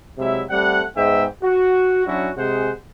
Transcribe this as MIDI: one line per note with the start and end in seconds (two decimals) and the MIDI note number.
0.18 0.42 48
0.18 0.42 54
0.18 0.42 56
0.18 0.42 64
0.18 0.42 76
0.50 0.82 55
0.50 0.82 57
0.50 0.82 60
0.50 0.82 78
0.96 1.24 44
0.96 1.24 56
0.96 1.24 59
0.96 1.24 76
0.96 1.24 79
1.42 2.02 66
2.06 2.29 54
2.06 2.29 61
2.06 2.29 62
2.06 2.29 64
2.06 2.29 66
2.37 2.70 48
2.37 2.70 56
2.37 2.70 68
2.37 2.70 72
2.37 2.70 78